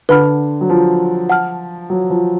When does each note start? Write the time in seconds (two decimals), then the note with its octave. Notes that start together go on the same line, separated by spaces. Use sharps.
0.09 D3 B4 F#5 B5 F6
0.61 F#3
0.70 F3
1.30 F#5 A5 F6
1.90 F#3
2.10 F3